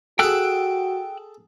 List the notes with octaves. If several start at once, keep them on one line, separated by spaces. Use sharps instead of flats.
F#4 G#4 A4 G5 E6 F#6